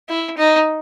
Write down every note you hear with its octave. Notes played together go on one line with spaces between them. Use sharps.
E4
D#4